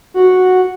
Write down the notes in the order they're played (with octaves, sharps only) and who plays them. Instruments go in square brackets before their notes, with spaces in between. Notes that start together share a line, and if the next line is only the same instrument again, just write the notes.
[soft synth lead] F#4